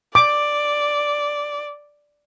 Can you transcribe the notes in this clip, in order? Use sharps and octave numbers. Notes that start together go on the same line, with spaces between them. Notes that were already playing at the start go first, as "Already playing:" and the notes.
D5 D6